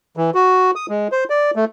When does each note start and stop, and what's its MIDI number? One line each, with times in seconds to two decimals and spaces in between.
0.17 0.30 52
0.34 0.71 66
0.76 0.86 87
0.89 1.08 56
1.12 1.24 72
1.30 1.51 74
1.56 1.65 57